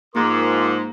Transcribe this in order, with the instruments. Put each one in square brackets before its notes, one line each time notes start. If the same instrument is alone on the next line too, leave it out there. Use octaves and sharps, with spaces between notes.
[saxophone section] G#2 [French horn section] F3 F4 A#4 [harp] A#3 [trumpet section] C6 D6